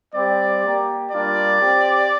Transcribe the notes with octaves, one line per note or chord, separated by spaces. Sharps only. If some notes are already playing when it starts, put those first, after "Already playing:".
G3 C4 G4 D5
A#3 G4
G3 A#3 D4 F4 D5
C4 G4